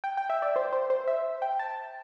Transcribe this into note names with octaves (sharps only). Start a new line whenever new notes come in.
G5
G5
E5
D5
C5
C5
C5
E5
G5
A5